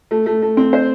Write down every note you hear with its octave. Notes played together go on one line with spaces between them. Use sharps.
A3
A3
A3
C4
C5